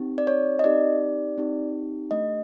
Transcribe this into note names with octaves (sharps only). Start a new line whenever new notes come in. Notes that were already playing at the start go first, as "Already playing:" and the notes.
Already playing: C4 D#4 G4
D5
C#5
D#5
C4 D#4 G4 D5
C4 D#4 G4
A3 D4 G4 D#5